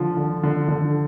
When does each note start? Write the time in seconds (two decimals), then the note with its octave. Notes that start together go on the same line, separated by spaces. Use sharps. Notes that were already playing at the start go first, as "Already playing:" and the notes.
Already playing: D3 F3
0.17 D3
0.43 D3
0.68 D3